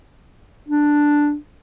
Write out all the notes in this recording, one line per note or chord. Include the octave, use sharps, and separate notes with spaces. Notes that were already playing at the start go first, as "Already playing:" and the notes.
D4